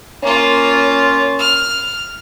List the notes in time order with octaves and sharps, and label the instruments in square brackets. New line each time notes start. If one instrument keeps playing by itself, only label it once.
[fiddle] A#3 F4 [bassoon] C#4
[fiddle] F6